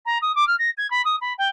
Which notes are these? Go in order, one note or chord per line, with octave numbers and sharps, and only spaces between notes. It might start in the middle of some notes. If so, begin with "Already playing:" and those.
A#5
D#6
D6
F6
A#6
G#6
B5
D#6
B5
G5